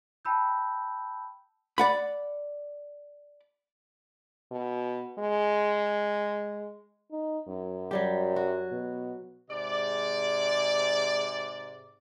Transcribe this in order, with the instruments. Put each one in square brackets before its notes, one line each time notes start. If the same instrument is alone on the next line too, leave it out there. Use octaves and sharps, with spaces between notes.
[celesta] G5 A5 B5 E6 G6
[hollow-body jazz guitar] D5 F#5 B5
[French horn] B2
G#3
D#4
F#2
[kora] F#3 G3 G4
F#4
[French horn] B2
[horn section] G#2 C3 G#3 D5